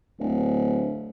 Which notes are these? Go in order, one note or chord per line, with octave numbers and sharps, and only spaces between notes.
D1